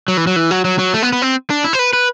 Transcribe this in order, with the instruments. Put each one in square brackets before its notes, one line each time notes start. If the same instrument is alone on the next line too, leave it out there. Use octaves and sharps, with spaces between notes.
[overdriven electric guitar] F#3
E3
F#3
E3
F#3
F#3
F#3
A3
B3
B3
C4
D4
E4
C5
B4
B4